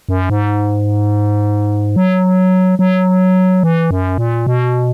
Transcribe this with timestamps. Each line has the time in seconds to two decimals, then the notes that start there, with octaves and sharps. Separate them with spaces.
0.09 F#2
0.29 G#2
1.96 F#3
2.79 F#3
3.63 E3
3.90 F#2
4.18 A#2
4.47 B2